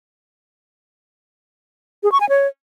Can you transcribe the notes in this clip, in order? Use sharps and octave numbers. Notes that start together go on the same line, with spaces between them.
G#4
C#6
G#5
C#5